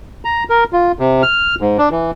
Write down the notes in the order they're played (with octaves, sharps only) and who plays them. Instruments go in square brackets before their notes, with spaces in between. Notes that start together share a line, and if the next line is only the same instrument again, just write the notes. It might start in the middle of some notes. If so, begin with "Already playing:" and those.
[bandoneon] A#5
A#4
F4
C3
F6
G#2
D4
E3